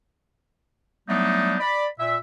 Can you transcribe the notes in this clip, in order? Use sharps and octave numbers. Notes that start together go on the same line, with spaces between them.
F#3 G3 A3 B3 D4 D#4
D5 B5
A#2 E5